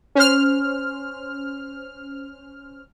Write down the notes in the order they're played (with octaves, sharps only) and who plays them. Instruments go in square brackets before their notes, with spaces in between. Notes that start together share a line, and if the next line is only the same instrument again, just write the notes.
[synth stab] C#4 C5 F6